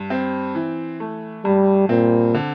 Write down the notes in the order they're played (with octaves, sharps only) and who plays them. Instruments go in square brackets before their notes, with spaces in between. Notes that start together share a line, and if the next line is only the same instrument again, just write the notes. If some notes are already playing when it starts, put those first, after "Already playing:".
Already playing: [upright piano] G2
C4
E3
A3
[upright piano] G2 [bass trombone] G3
[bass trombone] A#2 [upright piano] C4
[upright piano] D3